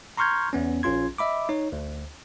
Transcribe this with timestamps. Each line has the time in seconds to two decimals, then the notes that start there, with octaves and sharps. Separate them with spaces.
0.17 A#5 C6 C#6 F6 G6 G#6
0.53 E2 B3 C#4
0.83 A#1 C#4 F4 C6 G#6
1.18 D#5 E5 B5 D6
1.49 D#4 C#5
1.72 D2